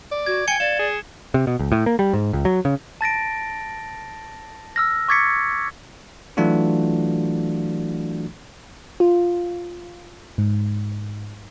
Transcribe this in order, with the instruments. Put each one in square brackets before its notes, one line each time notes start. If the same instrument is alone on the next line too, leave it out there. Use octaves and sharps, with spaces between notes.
[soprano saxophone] D5
[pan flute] F#4 [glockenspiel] G#6
[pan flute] G5 [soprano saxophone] G#5 [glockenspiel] G#6 C#7 G7
[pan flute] D5 [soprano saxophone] F5 [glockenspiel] E7
[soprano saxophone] G#4
[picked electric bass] C3
B2
C#2
A2
A#3
G3
G#2
C#2
F#3
C#3
[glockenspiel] A5 A6 A#6 D7
E6 F6 A#6
C#6 D6 G#6 A6 B6 C#7
[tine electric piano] E3 F#3 A3 D4 F4 F#4
[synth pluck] F4
G#2